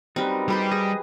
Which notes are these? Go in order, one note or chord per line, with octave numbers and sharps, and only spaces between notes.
F#2 G3 C4 D#4 A#4 B4
G3 G4 G#4 B4 C5
G#4 D#5